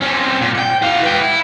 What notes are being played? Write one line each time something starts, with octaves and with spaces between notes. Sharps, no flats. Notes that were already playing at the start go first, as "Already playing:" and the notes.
C4 C#4
A#2
F#5 G5
F#4 F5
B4 G5
E4